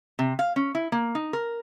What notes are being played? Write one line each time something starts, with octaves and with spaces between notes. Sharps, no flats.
C3
F5
C#4
E4
A#3
D#4
A#4